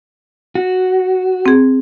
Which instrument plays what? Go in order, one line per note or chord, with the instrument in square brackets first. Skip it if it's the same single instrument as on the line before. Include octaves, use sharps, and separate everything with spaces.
[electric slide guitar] F#4
[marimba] C4 G#4